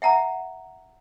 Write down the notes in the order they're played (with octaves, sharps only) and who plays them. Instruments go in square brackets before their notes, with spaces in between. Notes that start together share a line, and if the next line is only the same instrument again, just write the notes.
[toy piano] E5 F#5 A#5